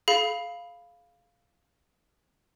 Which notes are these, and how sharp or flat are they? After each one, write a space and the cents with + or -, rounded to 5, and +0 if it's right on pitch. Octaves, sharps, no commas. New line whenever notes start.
G#4 +40 F5 +0 B5 +0